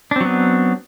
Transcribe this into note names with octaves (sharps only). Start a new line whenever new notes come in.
F#3 B3 C4 D4